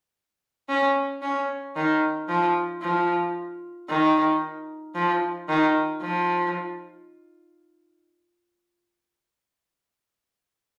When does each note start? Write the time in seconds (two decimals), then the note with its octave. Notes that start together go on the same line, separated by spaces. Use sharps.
0.69 C#4
1.22 C#4
1.76 D#3
2.28 F3
2.82 F3
3.89 D#3
4.95 F3
5.49 D#3
6.02 F3